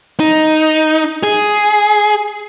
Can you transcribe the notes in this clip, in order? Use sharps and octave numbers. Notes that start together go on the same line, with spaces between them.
D#4
G#4